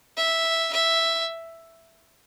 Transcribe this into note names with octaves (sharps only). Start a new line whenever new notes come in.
E5
E5